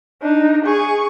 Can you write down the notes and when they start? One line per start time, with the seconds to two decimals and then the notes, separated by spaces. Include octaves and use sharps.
0.22 D4 D#4
0.65 G#4 C#6